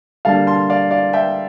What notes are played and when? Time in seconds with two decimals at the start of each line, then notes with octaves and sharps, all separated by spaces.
0.25 D3 G3 A#3 D4 F5 A5
0.47 A5 C6
0.70 D5 F5
0.91 D5 F5
1.13 E5 G5